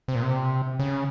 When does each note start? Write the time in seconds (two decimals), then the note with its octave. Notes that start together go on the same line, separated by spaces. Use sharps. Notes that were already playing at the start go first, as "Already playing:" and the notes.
0.08 C3
0.15 A#2
0.23 C3
0.79 C#3